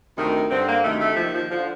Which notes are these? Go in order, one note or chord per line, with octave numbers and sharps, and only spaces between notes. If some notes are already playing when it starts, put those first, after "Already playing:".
D2 C3 D#3
G2 D3 C4
A#3
D2 C3 D#3 A3
A3
D#2 D#3 F3
F3
D3 F3